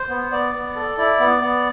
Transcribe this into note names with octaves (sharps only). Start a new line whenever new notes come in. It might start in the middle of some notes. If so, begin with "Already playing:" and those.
Already playing: C5
B3
B3 D5
B3
A4
E4 D5
B3
B3